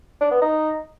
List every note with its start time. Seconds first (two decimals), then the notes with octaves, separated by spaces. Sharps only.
0.21 D4
0.31 B3
0.42 D#4